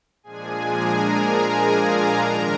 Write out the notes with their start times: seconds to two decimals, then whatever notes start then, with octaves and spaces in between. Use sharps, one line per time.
0.23 A#2 F3 G#3 D4 G#4 G#5
0.72 A#4 A#5
1.21 G#4 G#5
1.70 F4 F5
2.19 G#2 D#3 G#3 D4 A#4 A#5